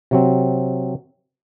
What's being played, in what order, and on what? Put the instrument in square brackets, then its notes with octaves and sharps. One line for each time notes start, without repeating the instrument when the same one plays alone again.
[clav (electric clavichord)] C3 F#3 C4